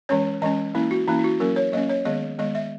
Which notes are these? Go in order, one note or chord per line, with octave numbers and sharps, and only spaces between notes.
E3 G#3 C#4 C#5
E3 G#3 C#4 D#5
E3 A#3 C#4 E4
F#4
E3 A#3 C#4 E4
E4
F#4
F#3 A#3 C#4 A#4
C#5
F#3 A#3 C#4 D#5
C#5
D#3 G#3 B3 D#5
D#3 G#3 B3 D#5
E5